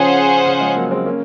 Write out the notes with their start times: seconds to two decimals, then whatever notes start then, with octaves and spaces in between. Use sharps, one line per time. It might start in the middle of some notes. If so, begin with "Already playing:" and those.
Already playing: C#3 F3 C#4 G#4 C5 F#5
0.46 C#3
0.61 F3 G#3
0.76 F#3 A#3
0.91 G#3 C4
1.05 A#3 C#4